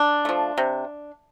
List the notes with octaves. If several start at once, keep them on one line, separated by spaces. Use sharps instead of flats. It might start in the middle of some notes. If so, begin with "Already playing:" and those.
Already playing: D4
F3 A3
C3